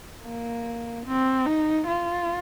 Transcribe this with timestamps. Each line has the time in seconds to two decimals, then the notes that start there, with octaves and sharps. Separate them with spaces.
0.24 A#3
1.06 C4
1.46 D#4
1.88 F4